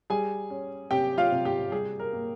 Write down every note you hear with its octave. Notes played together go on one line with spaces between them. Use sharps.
G3 G#4 G#5
C#4
C3 G4 G5
F4 F5
C3
G4 G5
G3 G#4
A#4
A#3